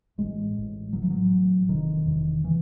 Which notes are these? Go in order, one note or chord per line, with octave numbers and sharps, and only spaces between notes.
A1 A2 G#3
A1 A2
A1 A2 F#3
E3
F#3
A1 A2
E1 E2 C3 D#3
E1 E2 C3
C3 E3